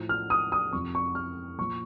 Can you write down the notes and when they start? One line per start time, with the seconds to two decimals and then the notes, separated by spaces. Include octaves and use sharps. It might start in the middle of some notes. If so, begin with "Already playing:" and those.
Already playing: A2 F3
0.09 F6
0.30 D#6
0.52 D#6
0.73 F2 C3 F3 C#6
0.95 C#6
1.15 F6
1.58 A#2 F3 C#6